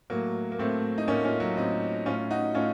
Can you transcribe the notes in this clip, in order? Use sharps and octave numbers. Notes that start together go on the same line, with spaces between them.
A2 F#3 A#3
A#3
A2 A3 C4
D#4
A2 A#3 C#4
C#4 F4
F#3
A2 C4 D#4
A2 C#4 F4
D#4 F#4
A2 C#4 F4